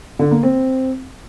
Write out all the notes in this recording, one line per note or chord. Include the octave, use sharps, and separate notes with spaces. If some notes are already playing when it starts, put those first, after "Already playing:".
D3
A#3
C4